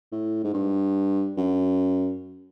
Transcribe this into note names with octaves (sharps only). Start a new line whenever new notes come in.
A2
G#2
G2
F#2